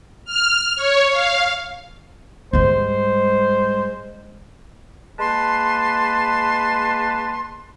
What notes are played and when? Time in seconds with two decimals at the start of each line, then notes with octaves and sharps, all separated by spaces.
0.25 F6
0.76 C#5
1.10 F5
2.53 G#2 G3 G#3 C5
5.19 G#3 A#3 B4 A5 C6